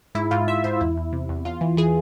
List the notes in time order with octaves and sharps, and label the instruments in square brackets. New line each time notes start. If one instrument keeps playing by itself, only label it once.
[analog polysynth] G#2 E4
G#2 F4
G#2 E5
G#2 C5
E2 E4
E2
C3
E2
E2 F4
E3
E3 G#4